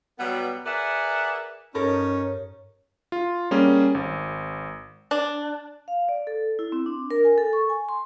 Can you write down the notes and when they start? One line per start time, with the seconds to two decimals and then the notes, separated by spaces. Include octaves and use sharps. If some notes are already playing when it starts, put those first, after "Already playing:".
0.19 B2 F#3 G3 B3
0.66 G#4 A#4 B4 D5 E5 F#5
1.75 G2 C#4 D#4 A4 A#4 C#5
3.12 F4
3.51 G3 A#3 C#4 G#4
3.95 G#1
5.11 D4
5.88 F5
6.09 D5
6.27 A4
6.59 E4
6.72 C4
6.86 D4
7.10 A#4
7.24 G#5
7.38 A4
7.53 C#6
7.69 G#5
7.89 C6